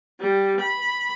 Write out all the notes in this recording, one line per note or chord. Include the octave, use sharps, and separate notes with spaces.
G3
B5